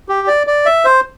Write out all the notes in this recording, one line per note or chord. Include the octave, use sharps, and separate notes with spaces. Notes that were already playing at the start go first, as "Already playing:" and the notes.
G4
D5
D5
E5
C5